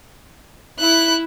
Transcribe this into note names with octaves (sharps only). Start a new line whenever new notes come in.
E4 F#6